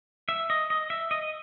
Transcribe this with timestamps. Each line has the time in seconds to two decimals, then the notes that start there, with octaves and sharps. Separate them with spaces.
0.29 E5
0.50 D#5
0.70 D#5
0.90 E5
1.11 D#5